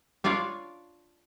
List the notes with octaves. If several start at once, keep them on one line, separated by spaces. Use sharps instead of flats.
D4 F4 C#5 D5 F5